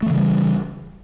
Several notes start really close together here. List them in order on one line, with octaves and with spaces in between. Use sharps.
A3 E3 C#3 G3